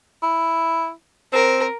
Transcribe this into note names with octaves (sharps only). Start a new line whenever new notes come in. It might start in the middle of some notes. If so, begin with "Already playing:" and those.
E4
C4 A#4